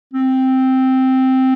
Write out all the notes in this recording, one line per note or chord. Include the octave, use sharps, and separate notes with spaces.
C4